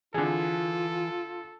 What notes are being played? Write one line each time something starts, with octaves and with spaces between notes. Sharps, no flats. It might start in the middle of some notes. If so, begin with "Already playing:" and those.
D3 E3 F4 G#4 A4